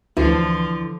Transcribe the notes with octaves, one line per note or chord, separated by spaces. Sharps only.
D2 D3 E3 F3